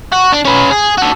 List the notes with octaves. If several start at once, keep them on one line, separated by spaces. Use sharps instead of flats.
F#4
D4
C#4 B4
G#4
F#4 A4